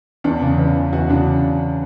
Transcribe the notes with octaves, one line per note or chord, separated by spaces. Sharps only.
E2 D4
C#3
E2
E3
E2 F#4
C#3 D4